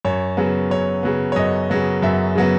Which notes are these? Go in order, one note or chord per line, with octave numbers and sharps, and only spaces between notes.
F#2 C#5
C#3 F#3 B3
F#2 C#5
C#3 F#3 B3
C#5
F#2 D#5
C#3 F#3 B3
F#2 E5
C#3 F#3 B3